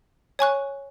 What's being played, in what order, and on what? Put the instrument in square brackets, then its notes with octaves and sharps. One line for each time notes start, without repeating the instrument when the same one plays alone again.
[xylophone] C#5 G#5 C#6 F#6